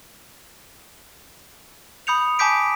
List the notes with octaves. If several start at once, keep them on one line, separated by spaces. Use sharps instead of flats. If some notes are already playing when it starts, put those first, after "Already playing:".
B5 D#6 G6 C#7 F7
G#5 A5 D6 G6 B6 D7